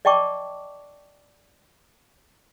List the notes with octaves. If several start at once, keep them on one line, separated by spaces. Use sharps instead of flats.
D5 D#5 G5 A5 C#6 D6